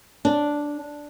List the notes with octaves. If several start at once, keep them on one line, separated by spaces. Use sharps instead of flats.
D4